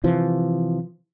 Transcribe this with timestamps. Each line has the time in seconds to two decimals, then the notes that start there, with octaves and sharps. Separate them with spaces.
0.04 C3 E3 F3